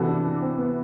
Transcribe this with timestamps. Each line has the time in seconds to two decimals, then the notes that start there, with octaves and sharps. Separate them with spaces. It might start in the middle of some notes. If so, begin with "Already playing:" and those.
Already playing: C3 E3 B3 F#4 A4
0.08 D4
0.25 D4
0.42 C4
0.58 B3